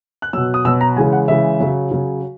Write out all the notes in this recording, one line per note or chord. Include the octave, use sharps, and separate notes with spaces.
F#6
B2 F#3 E6
D#6
B2 F#3 E6
A#5
C#3 E3 G#3 G#5
F#5
C#3 E3 G#3 E5
C#3 F#3
C#3 F#3